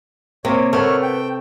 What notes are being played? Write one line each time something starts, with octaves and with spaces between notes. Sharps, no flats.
C3 A#3 C#5
A3 B3 A#4 C#5 F6
G5